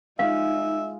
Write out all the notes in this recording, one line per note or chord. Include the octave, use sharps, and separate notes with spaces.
G#3 D#4 F4 E5 F5